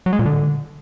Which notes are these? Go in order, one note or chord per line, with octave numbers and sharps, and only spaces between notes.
F#3
G#3
A#2
D3